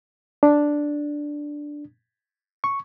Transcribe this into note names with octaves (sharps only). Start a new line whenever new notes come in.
D4
C#6